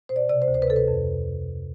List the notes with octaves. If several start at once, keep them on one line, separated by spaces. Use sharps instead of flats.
B2 C5
D5
C3 D5
C5
D2
C5
B4
C3 A4
B4
F2